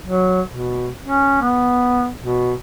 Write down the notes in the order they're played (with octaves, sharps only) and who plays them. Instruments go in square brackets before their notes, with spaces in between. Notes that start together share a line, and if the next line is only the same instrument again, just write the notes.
[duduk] F#3
B2
C#4
B3
B2